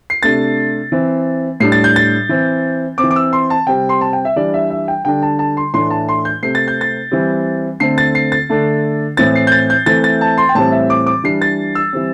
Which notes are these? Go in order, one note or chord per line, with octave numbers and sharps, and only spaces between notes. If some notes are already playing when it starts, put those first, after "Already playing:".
C7
C3 A3 D4 A6
E3 C4
A2 G3 D4 C7
A6
G6
A6
E3 C4
C4 D6
E3
D6
E6
C6
A5
C3 G3 C4 G5
C6
A5
G5
E5
E3 G3 D4 D5
E5
E5
G5
D3 G3 D4 G5
A5
A5
C6
A2 E3 A3 D4 C6
A5
C6
G6
C3 A3 C4 C7
A6
G6
A6
E3 G3 C4
D3 A3 C4 C7
A6
C7
A6
D3 A3 D4
A2 E3 C4 A6
C7
G6
A6
G6
E3 A3 C4 A6
A6
A5
C6
G5
A2 E3 G3 C4 A5
E5
D6
D6
E3 G3 D4 C7
A6
E6
E3 G3 C4